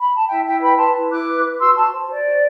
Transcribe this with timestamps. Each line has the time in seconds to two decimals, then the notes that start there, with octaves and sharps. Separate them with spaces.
0.01 B5
0.15 A5
0.29 E4 E5 G5
0.45 E4 E5 G5
0.61 B4 G5 B5
0.77 B4 A5 C6
0.95 E4
1.10 E4 D6 F#6
1.26 B4
1.44 B4
1.59 F#4 C6 E6
1.76 F#4 A5 C6
1.92 C5
2.08 C5 D5
2.25 F#4